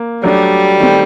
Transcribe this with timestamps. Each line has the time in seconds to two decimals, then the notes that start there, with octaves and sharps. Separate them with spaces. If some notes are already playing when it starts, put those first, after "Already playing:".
Already playing: A#3
0.24 F#3 G3 A3 D4 F#4
0.78 D#3 A3 C4